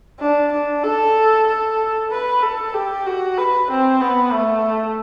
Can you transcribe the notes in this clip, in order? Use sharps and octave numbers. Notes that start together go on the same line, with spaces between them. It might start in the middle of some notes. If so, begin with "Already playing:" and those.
D4
D4
A4
A4
B4
A4
G4
F#4
B4
C4
B3
A3